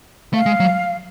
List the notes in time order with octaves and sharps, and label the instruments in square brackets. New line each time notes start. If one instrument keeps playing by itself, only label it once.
[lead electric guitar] A3 [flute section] F5
[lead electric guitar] G#3
F#3